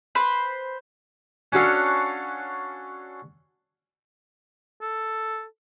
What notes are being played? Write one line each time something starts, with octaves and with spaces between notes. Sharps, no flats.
B4 C5 B5
C#4 D4 F#4 A4 F5
A4